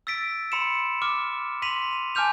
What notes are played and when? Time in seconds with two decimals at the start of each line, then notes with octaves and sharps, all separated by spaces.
0.07 E6 A6 B6 D7
0.52 B5 C6 C#7 E7
1.02 D6 F6
1.62 C6 B6 D#7 F7
2.15 G#5 A5 D6 F6 G6 F7